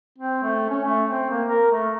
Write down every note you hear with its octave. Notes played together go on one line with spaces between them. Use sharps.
C4
A3
C#4
A3
C4
A#3
A#4
A3